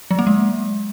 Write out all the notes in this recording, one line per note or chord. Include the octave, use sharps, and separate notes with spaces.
F#3
A#3
G#3